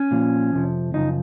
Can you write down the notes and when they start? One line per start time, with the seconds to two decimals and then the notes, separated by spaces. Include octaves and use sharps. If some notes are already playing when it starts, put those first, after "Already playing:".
Already playing: C#4
0.11 A#2 F3
0.53 F2 C3 F3
0.94 F#2 C#3 F3 D#4